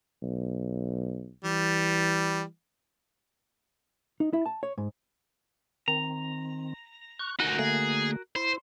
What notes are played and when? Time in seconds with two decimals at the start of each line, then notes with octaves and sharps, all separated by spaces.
0.23 B1
1.44 E3 G3
4.20 D#4
4.33 E4
4.46 A5
4.63 C#5
4.78 G#2
5.88 D#3 C4 A#5
7.19 C#6 F#6
7.40 D2 D#4 F#4 A#4 G#5
7.59 D3 A3 A#3 G#4
8.36 E4 C5